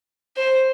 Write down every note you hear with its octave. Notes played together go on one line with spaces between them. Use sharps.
C5